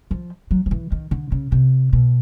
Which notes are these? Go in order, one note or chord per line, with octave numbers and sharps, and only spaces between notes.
F3
F#3
F3
E3
D#3
D3
C#3
C3
B2